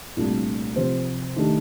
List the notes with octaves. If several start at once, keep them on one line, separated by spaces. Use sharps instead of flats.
C2 A#2 A3 D4 F4
C3 F3 C4 G4
D#3 A3 D4 G4